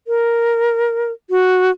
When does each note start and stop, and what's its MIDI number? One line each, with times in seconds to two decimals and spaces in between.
0.07 1.12 70
1.30 1.71 66